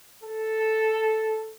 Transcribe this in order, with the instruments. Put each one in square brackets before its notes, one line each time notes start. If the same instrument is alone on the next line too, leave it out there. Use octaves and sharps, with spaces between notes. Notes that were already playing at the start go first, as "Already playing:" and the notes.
[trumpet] A4